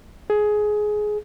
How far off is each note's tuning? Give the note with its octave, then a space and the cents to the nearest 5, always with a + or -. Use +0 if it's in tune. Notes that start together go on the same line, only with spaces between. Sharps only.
G#4 +15